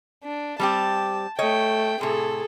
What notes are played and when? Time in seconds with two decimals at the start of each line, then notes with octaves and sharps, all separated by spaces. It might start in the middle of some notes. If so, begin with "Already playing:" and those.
0.23 D4
0.60 G3 C4 G4 A5
1.39 A3 C#5 D#5 G5
2.01 A2 C3 G#4 A4